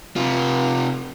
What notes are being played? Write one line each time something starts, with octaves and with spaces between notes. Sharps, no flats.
C3 F4